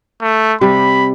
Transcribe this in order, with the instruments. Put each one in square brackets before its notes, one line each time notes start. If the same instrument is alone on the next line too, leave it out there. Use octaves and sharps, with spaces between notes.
[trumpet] A3
[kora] C3 G3 [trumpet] B5